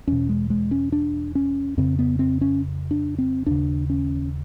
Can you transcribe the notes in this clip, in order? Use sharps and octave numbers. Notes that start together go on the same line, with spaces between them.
E2 B2 C#4
G#3
G#3
C#4
D4
C#4
F2 C#3 C4
B3
C4
C#4
D4
C4
D#2 C#3 D4
C#4